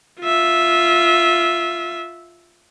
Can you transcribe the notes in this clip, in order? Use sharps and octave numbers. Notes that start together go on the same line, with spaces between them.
F4 E5